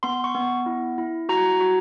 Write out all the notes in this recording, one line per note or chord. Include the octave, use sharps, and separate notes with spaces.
B3 C6
C#6
B3
E4
E4
F#4 A#5
F#4